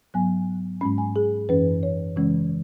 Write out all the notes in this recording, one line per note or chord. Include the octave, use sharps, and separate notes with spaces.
G#2 F#3 B3 G#5
G#2 G#3 C#4 B5
G#5
G#4
F#2 E3 C#4 B4
C#5
C#3 E3 G#3 C#4